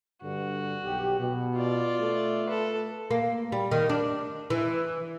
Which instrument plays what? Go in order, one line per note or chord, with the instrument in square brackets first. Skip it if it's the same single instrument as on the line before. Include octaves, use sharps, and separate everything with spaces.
[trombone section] G2 D3 [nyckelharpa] F#4
[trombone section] B1 G4
B2
[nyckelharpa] F4 D5
[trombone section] A3
[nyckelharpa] A4 B4
[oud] A#3
G3
D#3
D4
E3